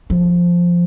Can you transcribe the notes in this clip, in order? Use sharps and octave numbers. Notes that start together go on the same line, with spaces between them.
F3